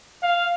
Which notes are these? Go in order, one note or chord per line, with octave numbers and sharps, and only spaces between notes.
F5